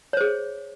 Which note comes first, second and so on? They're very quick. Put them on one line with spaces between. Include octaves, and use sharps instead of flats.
C#5 C5 G#4